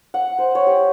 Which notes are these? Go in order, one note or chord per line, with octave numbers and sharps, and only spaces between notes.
F#5
C5
C#5
G4